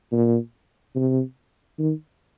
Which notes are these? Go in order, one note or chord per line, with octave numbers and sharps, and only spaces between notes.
A#2
C3
D#3